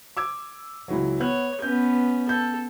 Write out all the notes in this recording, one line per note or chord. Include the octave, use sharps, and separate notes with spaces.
D6 E6 G#6
C#2 E3 F#3
B3 C#5 F#6
B3 C#4 G6
A4 G6